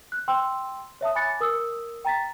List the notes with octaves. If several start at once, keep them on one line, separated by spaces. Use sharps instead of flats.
F#6
G5 C6 E6
C#5 E5 A5 D#6
G#5 B5 D6 F#6 A6 C#7
A#4 D#6 E6
G5 A#5 A6 B6